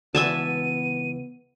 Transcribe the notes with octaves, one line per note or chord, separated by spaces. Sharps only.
C#2 E3 B3 F#4 E5 G#5 A5 D#7